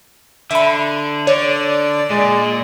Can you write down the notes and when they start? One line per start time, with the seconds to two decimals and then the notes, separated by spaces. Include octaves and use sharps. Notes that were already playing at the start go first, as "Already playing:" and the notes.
0.51 D3 E5 B5
1.27 D3 C#5 D5
2.10 A#2 G#3